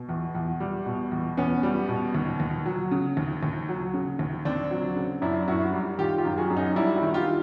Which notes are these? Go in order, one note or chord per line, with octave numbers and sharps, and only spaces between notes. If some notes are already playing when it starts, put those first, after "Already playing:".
Already playing: B2
E2
E2
G3
B2
E2
E2 B3 C#4
G3
B2
D#2
D#2
F#3
C#3
D#2
D#2
F#3
C#3
D#2
D#2 C4 D4
F#3
C#3
F#2 D4 E4
F#2 E4 F#4
G3
D#3 F4 G4
F4 G4
F#2
F#4 G#4
F#2
C#4 D#4
G3 D4 E4
E4 F#4
D#3
F4 G4